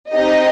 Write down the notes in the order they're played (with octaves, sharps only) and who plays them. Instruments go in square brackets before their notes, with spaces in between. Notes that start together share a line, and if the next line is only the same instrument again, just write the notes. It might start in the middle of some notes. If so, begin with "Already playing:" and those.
[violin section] C4 D#4 G4 D#5